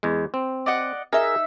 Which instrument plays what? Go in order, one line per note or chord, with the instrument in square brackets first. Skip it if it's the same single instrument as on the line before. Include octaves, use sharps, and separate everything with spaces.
[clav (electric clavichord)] E2 G#3
C4
[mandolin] D5 D#5 F#5
[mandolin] D#4 E5 [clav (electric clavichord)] G#4 A#4